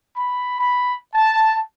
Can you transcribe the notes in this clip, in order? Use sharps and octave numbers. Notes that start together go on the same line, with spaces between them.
B5
B5
A5